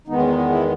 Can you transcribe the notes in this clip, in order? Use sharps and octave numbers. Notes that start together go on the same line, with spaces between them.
E2 D#3 G#3 B3 D#4
C#4
D#4
D#4
E4